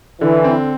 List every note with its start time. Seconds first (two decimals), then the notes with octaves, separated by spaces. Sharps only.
0.21 D3 E3
0.44 C4